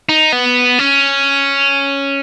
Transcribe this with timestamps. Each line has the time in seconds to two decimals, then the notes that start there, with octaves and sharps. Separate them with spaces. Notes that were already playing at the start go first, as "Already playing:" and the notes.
0.09 D#4
0.33 B3
0.79 C#4